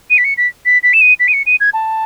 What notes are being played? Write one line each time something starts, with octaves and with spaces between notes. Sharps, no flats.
D#7
B6
C#7
B6
B6
B6
E7
D#7
B6
D#7
C#7
D#7
G#6
A5